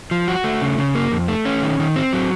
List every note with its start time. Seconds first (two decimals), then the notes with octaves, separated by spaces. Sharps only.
0.11 F3
0.28 F#4
0.44 A3
0.62 C#3
0.78 C#3
0.95 A#3
1.12 F2
1.28 A3
1.45 C#4
1.62 D#3
1.79 D#3
1.96 C4
2.13 F#3